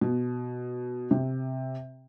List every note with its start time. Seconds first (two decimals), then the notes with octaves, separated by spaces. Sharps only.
0.01 B2
1.11 C3